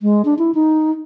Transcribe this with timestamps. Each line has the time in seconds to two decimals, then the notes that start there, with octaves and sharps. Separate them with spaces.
0.02 G#3
0.25 D4
0.39 E4
0.54 D#4